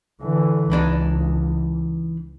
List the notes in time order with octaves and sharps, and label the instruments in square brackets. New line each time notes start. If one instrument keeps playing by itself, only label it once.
[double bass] D3 E3
[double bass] C#2 [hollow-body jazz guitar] E3 D4 D#4